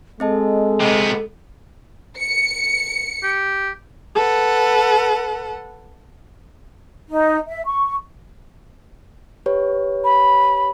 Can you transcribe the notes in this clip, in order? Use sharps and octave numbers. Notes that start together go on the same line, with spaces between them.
G#3 C4 A4 D#5 A5
C3 B3
C#7
G4
A4 B4 F#5
D#4
E5
C#6
G4 B4 C#5
B5